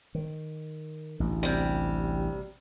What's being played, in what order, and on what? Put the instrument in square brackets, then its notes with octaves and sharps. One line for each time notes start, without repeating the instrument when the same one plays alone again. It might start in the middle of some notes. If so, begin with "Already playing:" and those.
[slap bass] D#3
A1 D2
[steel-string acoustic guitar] C3 G3